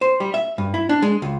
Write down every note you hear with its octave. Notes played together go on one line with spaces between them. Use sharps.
C5
G3
E5
G2
E4
D4
G#3
C#2